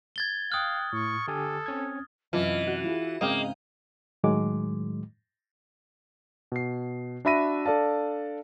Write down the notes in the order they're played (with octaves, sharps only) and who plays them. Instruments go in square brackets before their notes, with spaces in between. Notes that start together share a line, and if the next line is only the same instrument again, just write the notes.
[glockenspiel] G#6 A6 G7
[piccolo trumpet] F5 [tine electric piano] G5 F#6 [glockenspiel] D#6 F6
[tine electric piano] A2 [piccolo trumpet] C#6
[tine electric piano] D3 G4 G#5 [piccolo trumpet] A4
[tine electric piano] C4 C#4 G#6
[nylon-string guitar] F#2 C3 A5 [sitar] E3 [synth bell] F4 [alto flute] D#5
[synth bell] F#4
[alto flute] E4 [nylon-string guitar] F4 G#4
[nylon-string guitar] G#2 C#3 C4 [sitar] A#3 [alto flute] G#4 [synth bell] D#5 F5 G5
[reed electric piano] A2 D#3 F#3 G#3 D6
[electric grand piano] B2 C7
D4 F#4 E5 B5 A#6 D#7
D4 A4 D5 F5 A5